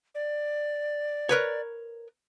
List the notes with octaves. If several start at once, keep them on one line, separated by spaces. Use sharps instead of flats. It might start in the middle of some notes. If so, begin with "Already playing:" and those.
D5
A#4 B4 C#5